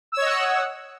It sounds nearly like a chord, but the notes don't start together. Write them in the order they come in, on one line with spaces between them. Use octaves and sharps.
E6 C#5 D#5 F#5